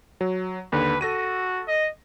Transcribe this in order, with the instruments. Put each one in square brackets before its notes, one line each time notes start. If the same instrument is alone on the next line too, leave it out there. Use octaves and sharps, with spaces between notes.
[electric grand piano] F#3
[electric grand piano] D#2 D3 [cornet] B4
[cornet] F#4 [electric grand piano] A4 A#6 D#7
[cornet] D#5